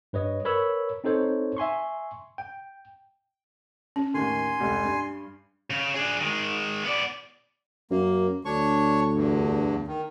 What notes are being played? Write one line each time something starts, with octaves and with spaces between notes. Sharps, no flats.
G2 B4 C#5 D#5
A#4 B4 C#5 B5 E6
C4 D#4 A4 C5 C#5
E5 G#5 C6 C#6
G5
C#4
A1 D#2 D#3 G#5 C6
F1 C#2
G2
C#3
D4 G#4
D#3 G#3
B3 D5
F#2 A#3
D2 D4 C#5 C#6
E2 G2
D#3